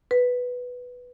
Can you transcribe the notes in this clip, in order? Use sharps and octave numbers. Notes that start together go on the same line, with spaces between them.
B4